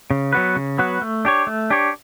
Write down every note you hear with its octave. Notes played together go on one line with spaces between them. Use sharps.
C#3
F#3 B3 F#4 B4
C#3
F#3 B3 F#4 B4
A3
D4 G4 C#5
A3
D4 G4 C#5